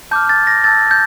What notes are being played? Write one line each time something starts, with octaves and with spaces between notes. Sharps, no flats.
A5 D6 F6 G6
A6
A#6
A5 E6 G6 A6
G6